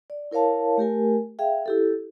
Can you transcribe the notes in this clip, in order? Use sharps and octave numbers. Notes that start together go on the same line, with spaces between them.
D5
E4 A#4 C#5 F5 A5
A3 G4 A#4 G#5
G#4 E5 F5 G5
E4 G4 A4